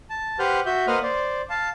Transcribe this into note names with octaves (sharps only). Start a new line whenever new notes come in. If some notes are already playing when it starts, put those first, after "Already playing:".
A5
G4 B4 C5 F#5 F6 G6
F#4 E5 G6
A#3 B4 C5 D#5 F#5 F6
C5 D5
F5 A5